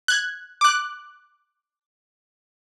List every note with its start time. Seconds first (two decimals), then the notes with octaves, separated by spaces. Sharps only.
0.08 F#6 G#6
0.61 D6 F#6